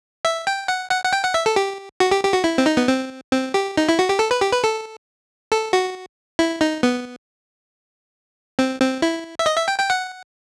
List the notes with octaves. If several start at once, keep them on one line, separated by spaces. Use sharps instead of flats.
E5
G5
F#5
F#5
F#5
G5
F#5
E5
A4
G4
F#4
G4
G4
F#4
E4
C4
D#4
B3
C4
C4
G4
D#4
E4
F#4
G4
A4
B4
G4
B4
A4
A4
F#4
E4
D#4
B3
C4
C4
E4
E5
D#5
E5
G5
G5
F#5